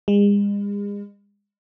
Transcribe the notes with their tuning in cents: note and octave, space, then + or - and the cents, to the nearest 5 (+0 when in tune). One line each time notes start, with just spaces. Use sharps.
G#3 -40